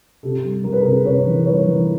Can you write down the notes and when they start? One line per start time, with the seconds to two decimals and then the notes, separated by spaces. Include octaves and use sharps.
0.23 C3 G4 A4
0.43 G3
0.64 G3 A#4
0.73 B4
0.80 G#4 A#4
0.84 C3
1.05 C3 B4 C#5
1.26 E3
1.46 G3 B4 C#5
1.67 E3